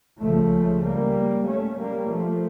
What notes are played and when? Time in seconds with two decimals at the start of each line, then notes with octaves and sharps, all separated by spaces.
0.21 C#2 C#3 F3 A3
0.83 G3 A#3
1.46 A3 C#4
1.77 G3 A#3
2.09 F3 A3